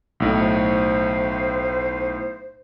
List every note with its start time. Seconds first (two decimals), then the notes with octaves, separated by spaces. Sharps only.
0.20 B1 A2
0.40 C5